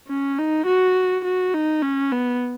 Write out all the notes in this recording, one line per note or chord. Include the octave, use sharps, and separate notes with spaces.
C#4
D#4
F#4
F#4
D#4
C#4
B3